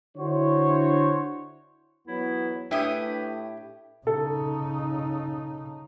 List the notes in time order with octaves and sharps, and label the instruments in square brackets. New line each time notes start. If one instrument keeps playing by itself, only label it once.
[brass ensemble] D3 D4 E4 F#4 C5 C#5
[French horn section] E2 F#3 B3 [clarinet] E4
[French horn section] A2 [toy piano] D4 D5 G5 [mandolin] E4 G4 D#6 [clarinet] B4
[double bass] C#3 D#4 [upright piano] A4